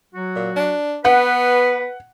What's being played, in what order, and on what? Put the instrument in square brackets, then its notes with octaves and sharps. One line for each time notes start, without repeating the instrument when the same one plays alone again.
[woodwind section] F#3 F#4
[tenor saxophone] A#2
D4
[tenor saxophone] B3 [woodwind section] B4 [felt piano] F#5